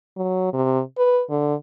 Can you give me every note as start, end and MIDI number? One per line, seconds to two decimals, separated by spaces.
0.17 0.51 54
0.53 0.80 48
0.98 1.22 71
1.30 1.55 50